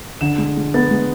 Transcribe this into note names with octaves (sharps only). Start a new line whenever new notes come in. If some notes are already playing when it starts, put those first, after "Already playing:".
D3 E7
G#3
G#3
B3 A6
G#3